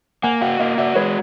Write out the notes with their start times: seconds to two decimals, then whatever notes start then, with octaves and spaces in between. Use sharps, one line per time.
0.23 A#3 F#5 G#5
0.41 F#4 F5 G5
0.59 A#3 D#5 F5
0.78 F#4 D5 E5
0.95 G#3 B4 C#5